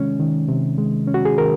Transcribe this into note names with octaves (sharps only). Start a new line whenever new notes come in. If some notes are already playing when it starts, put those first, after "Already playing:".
Already playing: C3 D#3 G#3 C#4
D#3
C3
G#3
C#4
F#4
G#4
D#3 A#4